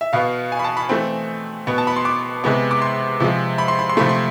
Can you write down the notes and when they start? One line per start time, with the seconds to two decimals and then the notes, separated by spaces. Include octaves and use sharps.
0.01 E5
0.13 B2 B3 F5
0.52 G#5
0.59 B5
0.64 A5
0.77 B5
0.89 E3 A3 C4
1.67 B2 B3
1.78 A5
1.87 B5
1.96 C6
2.05 D6
2.44 C3 G#3 B3
2.71 D6
2.82 C6
3.20 C3 F3 G#3
3.58 B5
3.68 C6
3.79 B5
3.89 C6
3.97 C3 F3 A3 B5
4.09 C6